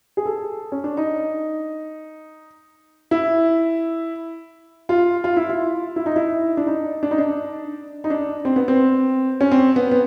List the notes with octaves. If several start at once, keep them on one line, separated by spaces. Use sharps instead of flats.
G#4
A4
C#4
D4
D#4
E4
F4
F4
E4
F4
E4
D#4
E4
D4
D#4
D4
D#4
D4
D#4
D4
C4
B3
C4
C#4
C4
B3
B3